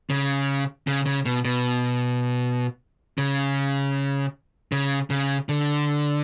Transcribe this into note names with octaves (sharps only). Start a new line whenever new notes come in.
C#3
C#3
C#3
B2
B2
C#3
C#3
C#3
D3